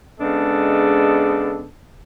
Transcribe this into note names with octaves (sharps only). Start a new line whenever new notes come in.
C#3 G#3 B3 D4 A4 D#5